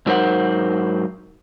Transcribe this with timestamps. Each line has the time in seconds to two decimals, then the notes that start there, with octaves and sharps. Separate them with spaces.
0.06 G#2 F#3 D#4 A#4 C5 F#5